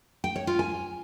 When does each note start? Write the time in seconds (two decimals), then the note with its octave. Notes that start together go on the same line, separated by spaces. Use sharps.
0.24 G5
0.36 C#5
0.47 F4
0.59 G#5